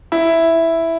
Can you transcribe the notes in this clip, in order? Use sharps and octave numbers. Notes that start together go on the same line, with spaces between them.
E4